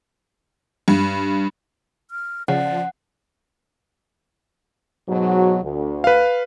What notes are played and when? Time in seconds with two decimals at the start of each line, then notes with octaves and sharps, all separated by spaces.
0.88 G2
2.11 F6
2.48 C#3 F3 D5 F#5
5.08 G#2 B2 F#3
5.62 D2
6.04 B4 F5